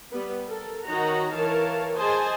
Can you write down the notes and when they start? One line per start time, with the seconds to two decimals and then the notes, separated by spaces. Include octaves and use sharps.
0.12 G3 B3 B4
0.47 A4 A#4
0.86 D#3 D#4 F#4 C#5 F#5 A#5
1.35 E3 A#4 C#5 F5 A5
1.97 G#4 C5 D#5 G#5 A5